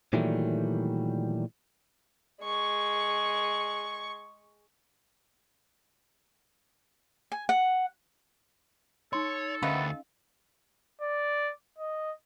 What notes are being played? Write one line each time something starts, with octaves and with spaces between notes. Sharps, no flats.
A#2 D#3 E3 F#3 G3 A3
G#3 C#6
G#5
F#5
D#4 A4 C#5 C6
D2 C3 D#3 B3 C#4 D#5 F5
D5
D#5